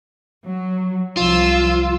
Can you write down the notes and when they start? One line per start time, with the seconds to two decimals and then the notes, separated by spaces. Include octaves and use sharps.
0.46 F#3
1.17 C2 F3 F4 E6